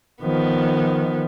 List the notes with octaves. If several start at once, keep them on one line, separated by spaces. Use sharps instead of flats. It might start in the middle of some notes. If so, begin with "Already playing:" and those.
D#3 F3 B3